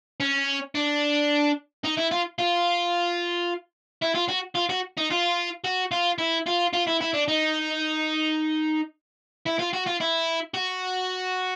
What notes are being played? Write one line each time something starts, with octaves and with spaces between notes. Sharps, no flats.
C#4
D4
D#4
E4
F4
F4
E4
F4
F#4
F4
F#4
D#4
F4
F#4
F4
E4
F4
F4
E4
E4
D4
D#4
E4
F4
F#4
F4
E4
F#4